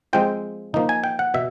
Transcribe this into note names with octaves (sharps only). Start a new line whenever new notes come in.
F3 G#3 C4 F4 G5
F3 A#3 D#4
G#5
G5
F#5
B2 E5